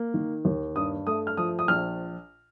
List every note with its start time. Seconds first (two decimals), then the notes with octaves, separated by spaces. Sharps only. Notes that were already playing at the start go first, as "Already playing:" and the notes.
Already playing: A#3
0.14 D#3
0.45 D#2
0.75 G2 D#6
1.07 A3 D#6
1.27 F6
1.37 F3 D#6
1.59 D#6
1.68 A#1 F6